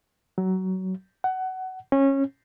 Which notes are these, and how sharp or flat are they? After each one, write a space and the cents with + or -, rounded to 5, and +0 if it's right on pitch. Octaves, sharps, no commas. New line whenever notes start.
F#3 +20
F#5 +20
C#4 -20